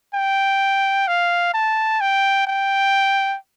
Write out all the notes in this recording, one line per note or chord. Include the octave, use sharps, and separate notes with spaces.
G5
F5
A5
G5
G5